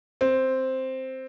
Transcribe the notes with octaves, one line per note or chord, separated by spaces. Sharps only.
C4